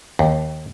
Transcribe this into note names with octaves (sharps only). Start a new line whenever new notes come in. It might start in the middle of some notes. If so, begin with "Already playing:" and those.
D#2